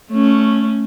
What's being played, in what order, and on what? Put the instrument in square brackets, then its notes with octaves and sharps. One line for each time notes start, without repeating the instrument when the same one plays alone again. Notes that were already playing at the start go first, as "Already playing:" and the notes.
[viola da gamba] A3 C#4